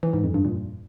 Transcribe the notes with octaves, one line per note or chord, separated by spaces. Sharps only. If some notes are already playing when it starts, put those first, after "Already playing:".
E3
G#2
F2
G2
A#2